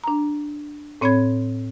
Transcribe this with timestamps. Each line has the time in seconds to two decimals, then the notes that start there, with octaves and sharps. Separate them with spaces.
0.04 D4 A#5
1.01 A2 C4 C#5 B5 C6 G#6